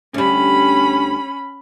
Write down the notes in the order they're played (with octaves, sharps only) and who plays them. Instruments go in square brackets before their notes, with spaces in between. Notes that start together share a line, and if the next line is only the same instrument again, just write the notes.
[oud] D2 G3 [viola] C#4 B5